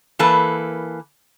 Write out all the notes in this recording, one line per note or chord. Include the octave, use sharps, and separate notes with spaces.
E3 A#3 A4 B4